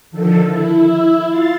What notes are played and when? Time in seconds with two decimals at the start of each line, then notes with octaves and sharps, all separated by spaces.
0.11 D3 D#3 F3 A4
0.46 E4
1.28 F4 F5 A6